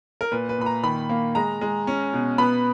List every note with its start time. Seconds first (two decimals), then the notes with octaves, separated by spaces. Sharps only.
0.21 A#4
0.32 A#2 B4
0.49 B4
0.58 A#2 B5
0.66 A#5
0.83 D#3 B5
1.10 A#3
1.35 G#3 A#5
1.61 G#3
1.87 C#4
2.13 B2
2.38 B3 B5